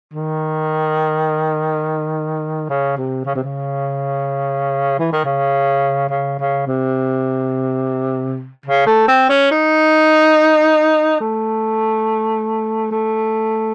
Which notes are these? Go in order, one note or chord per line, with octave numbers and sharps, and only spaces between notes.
D#3
C#3
C3
C#3
C3
C#3
E3
D#3
C#3
C#3
C#3
C3
C#3
A3
C4
C#4
D#4
A3
A3